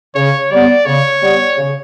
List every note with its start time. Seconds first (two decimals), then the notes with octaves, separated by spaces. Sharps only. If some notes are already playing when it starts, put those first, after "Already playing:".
0.15 C#3 C#5
0.51 G3 B3 D5
0.86 C#3 C#5
1.22 G3 B3
1.58 C#3